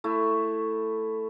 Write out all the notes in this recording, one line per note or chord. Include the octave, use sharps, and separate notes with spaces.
A3 E4